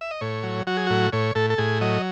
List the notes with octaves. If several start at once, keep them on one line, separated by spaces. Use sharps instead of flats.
E5
D#5
A2 C#5
F#3
F#3 F#4
G#4
A2 F#4
A2 C#5
A2 A4
A4
A2 G#4
F#3 D#5